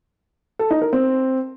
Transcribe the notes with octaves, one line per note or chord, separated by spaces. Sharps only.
A4
D#4
A#4
C4